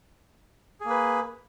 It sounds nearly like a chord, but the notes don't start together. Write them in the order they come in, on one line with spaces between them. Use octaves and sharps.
G#4 A#3 B4